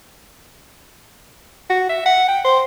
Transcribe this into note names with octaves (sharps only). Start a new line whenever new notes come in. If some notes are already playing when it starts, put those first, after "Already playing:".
F#4
E5
F#5
G5
C5